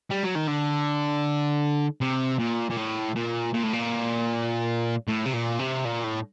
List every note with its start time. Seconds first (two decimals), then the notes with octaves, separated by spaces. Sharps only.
0.10 G3
0.23 F#3
0.35 D#3
0.47 D3
2.01 C3
2.39 A#2
2.70 A#2
2.77 A2
3.16 A#2
3.54 A#2
3.64 A2
3.73 A#2
5.08 A2
5.26 C3
5.33 A#2
5.59 C3
5.85 A#2
6.04 A2